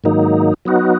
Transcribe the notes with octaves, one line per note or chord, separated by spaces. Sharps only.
G#2 D#3 F#3 A#3 D#4
F#3 B3 D#4 F#4